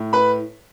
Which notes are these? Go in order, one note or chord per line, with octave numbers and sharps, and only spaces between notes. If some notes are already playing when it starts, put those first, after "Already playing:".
Already playing: A2
B4 B5